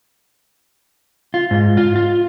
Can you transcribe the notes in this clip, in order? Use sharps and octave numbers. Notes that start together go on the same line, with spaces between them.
F4
G#2
F4
F4